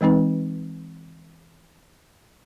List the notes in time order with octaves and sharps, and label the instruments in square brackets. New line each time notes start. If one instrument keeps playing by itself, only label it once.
[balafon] E3 G#3 C4 D#4 B4